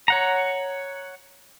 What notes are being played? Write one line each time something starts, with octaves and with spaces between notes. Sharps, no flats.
C#5 F#5 A#5